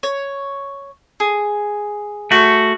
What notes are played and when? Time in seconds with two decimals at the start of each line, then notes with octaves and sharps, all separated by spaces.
0.03 C#5
1.20 G#4
2.31 A3 F#4